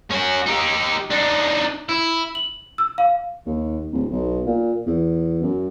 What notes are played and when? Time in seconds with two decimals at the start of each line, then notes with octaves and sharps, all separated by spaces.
0.11 C#4 F#4
0.47 D#4 G4
1.11 D4 D#4
1.89 E4
2.35 F#7
2.78 E6
2.98 F5
3.46 D#2
3.92 D1
4.11 B1
4.46 A#2
4.86 E2
5.42 F#2